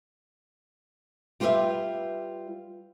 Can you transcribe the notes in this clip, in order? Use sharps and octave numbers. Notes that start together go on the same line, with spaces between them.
G3 F4 G4 A#4 B4 E5